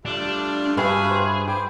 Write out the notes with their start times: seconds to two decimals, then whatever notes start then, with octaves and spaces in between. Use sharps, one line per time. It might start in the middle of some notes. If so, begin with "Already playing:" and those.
0.05 G3 A3 D4 F4
0.77 G2 F#4 G#4 B4 E5 F5 G5 C#6
1.11 C5
1.47 C5 G5 B5 D6